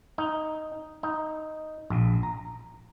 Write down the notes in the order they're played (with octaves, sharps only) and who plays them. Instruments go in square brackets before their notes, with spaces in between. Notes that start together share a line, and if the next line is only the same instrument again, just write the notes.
[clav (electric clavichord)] D#4
D#4
A#1
A#5